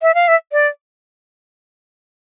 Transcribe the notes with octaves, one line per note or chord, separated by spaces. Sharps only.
E5
F5
E5
D5